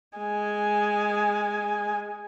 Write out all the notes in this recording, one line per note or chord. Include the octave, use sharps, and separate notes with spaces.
G#3 G#5